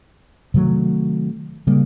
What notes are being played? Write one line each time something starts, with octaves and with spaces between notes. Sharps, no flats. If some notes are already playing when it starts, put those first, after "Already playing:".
C3 D#3 F#3 A3
C#3 G3 A#3